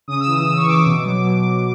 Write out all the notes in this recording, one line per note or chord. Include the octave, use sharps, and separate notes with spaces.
C#3 D#6
E6
E3
E6
C#3 E6
C#6
E3 D6
B2
F#3
B2
F#3